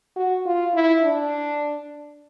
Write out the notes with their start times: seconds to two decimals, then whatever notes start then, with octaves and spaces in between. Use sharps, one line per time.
0.16 F#4
0.46 F4
0.74 E4
1.02 D4